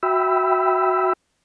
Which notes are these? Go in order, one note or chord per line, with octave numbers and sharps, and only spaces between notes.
F#4 E5 G5 B5 E6